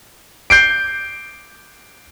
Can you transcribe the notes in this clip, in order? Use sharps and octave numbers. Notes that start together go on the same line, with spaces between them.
G6 C7 D7